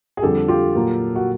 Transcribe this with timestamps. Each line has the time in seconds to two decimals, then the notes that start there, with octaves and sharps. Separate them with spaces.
0.17 G#4
0.22 F2 D3 G3 G4 A4
0.48 F4 G4
0.75 A#2 F#3 A#3
1.15 F#4